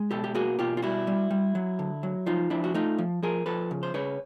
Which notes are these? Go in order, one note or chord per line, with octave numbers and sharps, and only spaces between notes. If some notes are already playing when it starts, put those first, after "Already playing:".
Already playing: G#3
B2 G4 A4
G4
A#3 F#4 G#4
B2 F4 G4
F4
G3 E4 F#4
G3
G3
F#3
D3
F#3
F3 D#4 F4
F3 D4 E4
F#4
A3 D#4 F4
F3
F3 G#4 A#4
F3 A4 B4
C#3
C5
C#3 B4 C#5